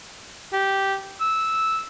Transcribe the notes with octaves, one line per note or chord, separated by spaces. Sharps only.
G4
E6